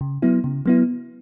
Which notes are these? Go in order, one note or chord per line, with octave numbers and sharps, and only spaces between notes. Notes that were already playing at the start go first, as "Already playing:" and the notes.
C#3
F#3 B3 E4
C#3
F#3 B3 E4